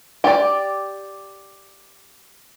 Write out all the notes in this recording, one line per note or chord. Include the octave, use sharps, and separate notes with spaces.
G4 D5